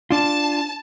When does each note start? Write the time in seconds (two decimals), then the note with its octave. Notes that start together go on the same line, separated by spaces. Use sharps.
0.11 D4 F4 A5